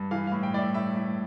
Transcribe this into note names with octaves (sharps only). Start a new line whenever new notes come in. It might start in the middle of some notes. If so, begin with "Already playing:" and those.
Already playing: G2
E3 F5
A2 F5
G5
A2 D5
E5
A2 E5
A2